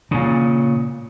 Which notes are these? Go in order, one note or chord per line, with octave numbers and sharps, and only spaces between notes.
A#2 C#3